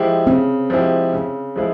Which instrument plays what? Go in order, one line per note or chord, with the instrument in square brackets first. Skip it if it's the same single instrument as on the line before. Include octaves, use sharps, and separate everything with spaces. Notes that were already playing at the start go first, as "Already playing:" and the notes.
Already playing: [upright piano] F3 G#3 E4 G4
[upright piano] C#3 [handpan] C4
[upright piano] F3 G#3 E4 G4
C#3
F3 G#3 E4